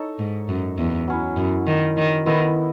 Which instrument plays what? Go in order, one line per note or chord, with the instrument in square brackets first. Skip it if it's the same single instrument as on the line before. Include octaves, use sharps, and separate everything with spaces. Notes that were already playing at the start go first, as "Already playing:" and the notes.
Already playing: [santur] D#4 A4 C#5
[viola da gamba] G#2
F#2
E2
[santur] F#3 C#4 E4
[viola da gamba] F#2
D#3
D#3
[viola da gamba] D#3 [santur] B3 E4 A4 D#5